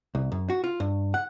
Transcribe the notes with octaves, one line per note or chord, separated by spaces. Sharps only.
C2
F#2
F#4
F4
G2
F#5